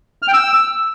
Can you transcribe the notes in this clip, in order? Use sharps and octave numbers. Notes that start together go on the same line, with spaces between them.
F6
G5
E6